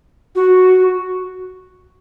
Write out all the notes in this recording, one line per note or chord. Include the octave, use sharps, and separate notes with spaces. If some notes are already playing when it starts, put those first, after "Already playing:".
F#4